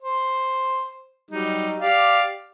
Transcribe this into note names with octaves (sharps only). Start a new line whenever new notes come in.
C5
F#3 G3 D#4
G4 D5 F5